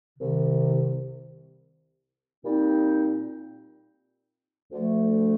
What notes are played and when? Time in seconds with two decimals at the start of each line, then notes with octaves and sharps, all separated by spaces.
0.17 C2 C3 D#3
2.45 A#2 G3 C4 D#4
4.72 D2 D3 F3 A3